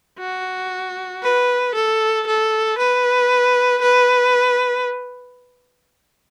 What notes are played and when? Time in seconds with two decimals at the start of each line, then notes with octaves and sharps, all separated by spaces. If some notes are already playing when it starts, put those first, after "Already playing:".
0.19 F#4
1.23 B4
1.75 A4
2.27 A4
2.79 B4
3.82 B4